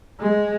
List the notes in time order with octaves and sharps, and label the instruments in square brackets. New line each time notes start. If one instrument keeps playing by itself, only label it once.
[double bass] G#3